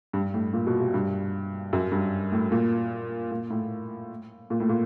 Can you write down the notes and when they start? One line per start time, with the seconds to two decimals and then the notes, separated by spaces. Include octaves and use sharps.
0.13 G2
0.34 A2
0.53 A#2
0.67 B2
0.80 C3
0.94 G2
1.73 F#2
1.92 G2
2.32 A2
2.52 A#2
3.32 A#2
3.50 A2
4.50 A#2
4.60 A2
4.69 A#2